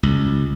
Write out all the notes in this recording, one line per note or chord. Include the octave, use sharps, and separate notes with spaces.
C#2